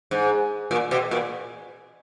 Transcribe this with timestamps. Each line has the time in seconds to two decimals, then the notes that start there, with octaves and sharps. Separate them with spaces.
0.11 G#2
0.71 A#2
0.91 B2
1.11 A#2